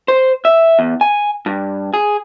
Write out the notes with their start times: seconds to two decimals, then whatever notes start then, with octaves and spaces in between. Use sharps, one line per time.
0.08 C5
0.45 E5
0.79 E2
1.01 G#5
1.46 G2
1.94 G#4